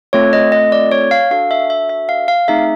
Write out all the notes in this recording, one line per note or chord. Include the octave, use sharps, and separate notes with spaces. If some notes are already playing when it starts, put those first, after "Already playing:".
A3 C4 F4 A4 C#5
D#5
D#5
D5
C#5
F5
D4 F#4 A4 F5
E5
E5
E5
F5
F5
A3 C4 D#4 G#4 E5